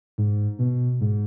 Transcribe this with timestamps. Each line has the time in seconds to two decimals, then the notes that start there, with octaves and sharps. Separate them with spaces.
0.18 G#2
0.59 B2
1.01 G#2